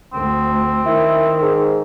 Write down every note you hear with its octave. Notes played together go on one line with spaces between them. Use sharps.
D2 C4
D#3 E4
G#2